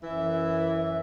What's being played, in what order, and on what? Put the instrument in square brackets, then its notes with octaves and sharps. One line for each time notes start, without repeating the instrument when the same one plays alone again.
[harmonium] F#2 E5 [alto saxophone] E3